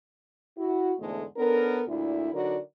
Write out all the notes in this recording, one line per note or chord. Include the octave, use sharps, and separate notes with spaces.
E4 F#4
E2 G#2 D3 G#3 A3
B3 C#4 D4 A4 A#4
D2 A#2 D3 E4
D3 F#3 D#4 F#4 A#4 D5